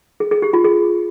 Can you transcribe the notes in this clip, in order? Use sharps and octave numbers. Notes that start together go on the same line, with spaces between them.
G#4
G#4
G4
F4
G#4